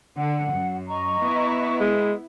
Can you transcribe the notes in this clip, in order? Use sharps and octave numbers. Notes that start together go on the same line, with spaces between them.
D3 F#5
F#2
D#5 A#5 C#6
B3 E4
G#3